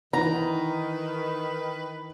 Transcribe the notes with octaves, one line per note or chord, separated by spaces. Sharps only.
D#3 E3 D#4 B4 A#5